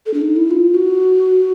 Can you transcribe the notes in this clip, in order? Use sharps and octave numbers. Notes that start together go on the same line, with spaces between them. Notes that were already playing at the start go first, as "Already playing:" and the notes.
A4
D4
D#4
E4
F4
F#4